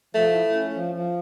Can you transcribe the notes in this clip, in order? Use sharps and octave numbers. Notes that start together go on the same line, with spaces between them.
F3 A3
E4
C#4
F3
F3